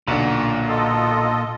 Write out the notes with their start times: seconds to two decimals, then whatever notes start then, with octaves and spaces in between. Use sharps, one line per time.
0.08 B1 A#2 D3
0.68 F4 A4 D#5